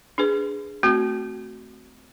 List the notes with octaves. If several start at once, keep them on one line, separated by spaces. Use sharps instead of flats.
D4 G#4 B4
A3 C4 F#4